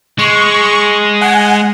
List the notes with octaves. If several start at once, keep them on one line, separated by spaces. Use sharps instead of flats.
G#3 C#6
F#5 G#5